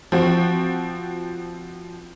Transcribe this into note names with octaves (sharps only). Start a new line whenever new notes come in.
F3 C4 F#4